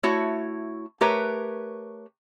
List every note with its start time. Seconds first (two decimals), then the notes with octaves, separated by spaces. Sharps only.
0.03 A3 E4 F#4 C#5
1.01 A3 G4 A#4 B4 C#5